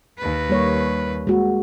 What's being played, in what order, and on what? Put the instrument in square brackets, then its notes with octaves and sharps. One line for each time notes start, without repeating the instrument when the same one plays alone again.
[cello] D#2 B4
[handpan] G3 A#3 C#5
G#3 A#3 F#4